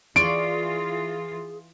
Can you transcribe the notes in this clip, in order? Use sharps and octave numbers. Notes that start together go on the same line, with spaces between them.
E3 F4 G#4 D5 C6 C#6 D7